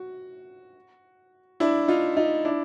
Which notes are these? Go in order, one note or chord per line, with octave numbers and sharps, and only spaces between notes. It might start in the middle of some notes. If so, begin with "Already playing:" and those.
Already playing: F#4
D4 E4
D#4 F4
D#4 F4
D4 E4